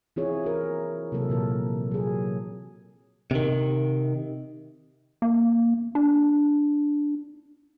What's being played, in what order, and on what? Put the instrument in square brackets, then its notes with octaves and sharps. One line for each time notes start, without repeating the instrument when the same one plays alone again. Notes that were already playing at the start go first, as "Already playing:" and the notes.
[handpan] E3 C4 E4 F4 G#4 C#5
F#4 A#4
C3 F#3 A#3 A4
A#2 E3 A#4
F#3 G#4
[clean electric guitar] C3 D#3
[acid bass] A#3
D4